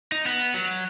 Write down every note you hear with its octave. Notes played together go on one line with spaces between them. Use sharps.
D#4
B3
F#3